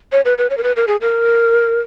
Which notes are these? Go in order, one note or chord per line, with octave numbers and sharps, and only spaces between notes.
C#5
B4
B4
C#5
A#4
B4
A#4
G#4
A#4